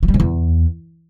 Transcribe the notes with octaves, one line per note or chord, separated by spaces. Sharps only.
F3
G3
C3
E2